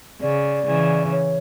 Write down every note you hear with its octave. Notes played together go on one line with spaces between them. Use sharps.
C#3 D5
C#3 E3
C#5